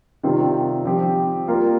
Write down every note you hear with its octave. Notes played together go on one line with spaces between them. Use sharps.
C3 D#3 G3 C4 F4
F3 C4 G4
G3 A#3 F4 A#4